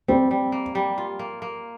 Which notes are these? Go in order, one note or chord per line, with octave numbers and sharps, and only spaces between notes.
G3 C4
G3
A#3
G3
F4
A#3
A#3